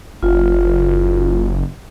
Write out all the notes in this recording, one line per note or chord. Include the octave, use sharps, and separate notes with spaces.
F#1 F4